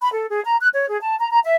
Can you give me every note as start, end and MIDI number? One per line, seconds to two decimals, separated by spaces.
0.01 0.11 83
0.12 0.27 69
0.30 0.41 68
0.45 0.57 82
0.60 0.68 90
0.73 0.89 73
0.90 0.99 68
1.01 1.15 81
1.19 1.31 82
1.32 1.40 82
1.44 1.56 76